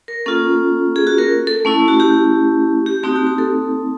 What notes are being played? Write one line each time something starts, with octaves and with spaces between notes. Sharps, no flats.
A#4
A#3 C#4 F4 A4
G#4
F#4
A#4
A4
A3 C#4 E4
F#4
G4
G4
A3 C4 D#4 F#4 G4
F#4
G4
A4